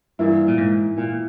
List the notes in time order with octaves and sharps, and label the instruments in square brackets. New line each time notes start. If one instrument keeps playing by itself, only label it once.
[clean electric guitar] G2 [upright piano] E3 A#3 E4
[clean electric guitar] A#2
G#2
A#2